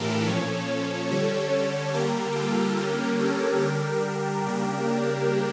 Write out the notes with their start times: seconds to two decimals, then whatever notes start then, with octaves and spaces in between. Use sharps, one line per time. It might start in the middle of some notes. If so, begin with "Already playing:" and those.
Already playing: A2 E3 A3 D4 F4 G4 A4 A#4
0.27 A#2 F3 C#4 A4 C#5
1.10 D3 G3 C#4 A4 C#5
1.94 D3 G3 A#3 G4 A#4
2.36 F4 A4
2.77 D3 G3 A#3 C#4 G4 A#4
3.19 A4 C#5
3.60 D3 G3 D4 G4 A#4
4.44 C#3 G3 A#3 D4